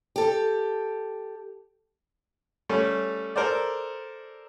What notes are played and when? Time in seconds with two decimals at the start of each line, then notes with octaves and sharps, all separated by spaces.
0.16 G4 A4
2.69 G3 A3 C#4
3.36 A4 A#4 C5 D5